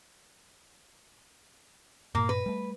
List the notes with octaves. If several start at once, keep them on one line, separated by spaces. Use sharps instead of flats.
G2 A#2 A#3
B4
G3 A3